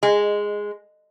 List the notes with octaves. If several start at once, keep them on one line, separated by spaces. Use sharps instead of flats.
G#3